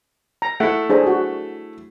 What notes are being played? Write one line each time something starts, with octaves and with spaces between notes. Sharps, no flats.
A#5
A3 E4 F#5
D4 G#4 C5
F#4